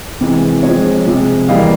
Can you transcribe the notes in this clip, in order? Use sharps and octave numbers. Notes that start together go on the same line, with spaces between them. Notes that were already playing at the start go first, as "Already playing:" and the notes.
C3 E3 G#3
F3 G#3 C4 C#5 D#5
C3 F3 G#3
E3 G3 A#3 D#5 F5